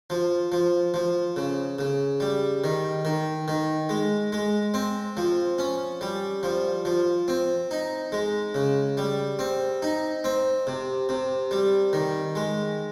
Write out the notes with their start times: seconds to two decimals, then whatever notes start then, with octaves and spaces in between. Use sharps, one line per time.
0.10 F3
0.52 F3
0.94 F3
1.36 C#3
1.79 C#3
2.20 G3
2.64 D#3
3.05 D#3
3.48 D#3
3.89 G#3
4.33 G#3
4.74 C4
5.17 F3
5.58 C#4
6.01 G3
6.43 F3
6.85 F3
7.28 C4
7.71 D#4
8.12 G#3
8.55 C#3
8.97 G3
9.39 C4
9.82 D#4
10.24 C4
10.67 C3
11.09 C3
11.51 G3
11.93 D#3
12.35 G#3